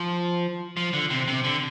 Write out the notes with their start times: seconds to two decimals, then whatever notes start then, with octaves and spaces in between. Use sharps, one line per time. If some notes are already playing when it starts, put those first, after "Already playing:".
Already playing: F3
0.77 F3
0.93 D3
1.10 C3
1.28 C3
1.44 D3